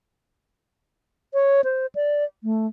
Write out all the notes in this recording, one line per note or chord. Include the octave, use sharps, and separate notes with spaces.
C#5
C5
D5
A3